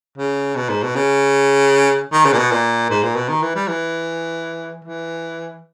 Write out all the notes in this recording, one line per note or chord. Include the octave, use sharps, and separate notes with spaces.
C#3
B2
G#2
B2
C#3
D#3
C#3
A#2
B2
A#2
G#2
A#2
B2
D#3
E3
G3
E3
E3